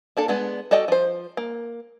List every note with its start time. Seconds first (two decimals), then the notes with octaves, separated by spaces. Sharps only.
0.17 A#3 D4 A4
0.28 G#3 B3 D4
0.71 F#4 A4 D5 D#5 G5
0.88 F3 C5
1.37 A#3